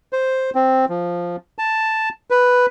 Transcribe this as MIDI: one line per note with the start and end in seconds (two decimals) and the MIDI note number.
0.13 0.50 72
0.55 0.85 60
0.89 1.36 53
1.59 2.09 81
2.30 2.66 71